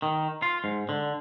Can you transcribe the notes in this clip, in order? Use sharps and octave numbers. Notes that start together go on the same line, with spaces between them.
D#3
F4
G#2
D3